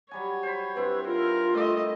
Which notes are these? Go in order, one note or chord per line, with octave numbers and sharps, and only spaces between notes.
F#3 G3 C#5 G#5
C5 B5
G2 C4 E4 B4
F4 A#4
A3 D#5